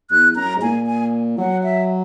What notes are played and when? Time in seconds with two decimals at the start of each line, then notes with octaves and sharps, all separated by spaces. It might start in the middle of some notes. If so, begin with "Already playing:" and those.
0.11 E2 F#6
0.36 F#2 A#5
0.56 G#2
0.62 A#2 G#5
0.87 G#5
1.38 F#3 F#5
1.63 E5